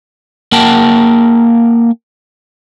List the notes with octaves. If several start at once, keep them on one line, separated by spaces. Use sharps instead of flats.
A#3 A#4 F#5 G5 A5